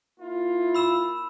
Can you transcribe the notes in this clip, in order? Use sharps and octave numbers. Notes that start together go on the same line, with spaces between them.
A#3 E4 F4
B5 E6 E7